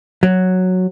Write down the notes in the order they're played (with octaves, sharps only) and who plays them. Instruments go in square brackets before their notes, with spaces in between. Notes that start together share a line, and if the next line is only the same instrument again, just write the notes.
[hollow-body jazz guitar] F#3